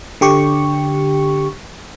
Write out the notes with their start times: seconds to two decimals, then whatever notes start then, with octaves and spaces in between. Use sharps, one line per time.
0.21 D3 G4 C#6